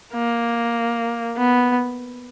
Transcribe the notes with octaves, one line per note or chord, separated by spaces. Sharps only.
A#3
B3